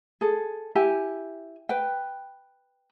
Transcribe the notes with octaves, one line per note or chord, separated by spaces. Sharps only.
G#4 A4
E4 G4 G#5
B4 G5